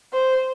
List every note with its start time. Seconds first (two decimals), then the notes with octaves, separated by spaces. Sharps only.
0.13 C5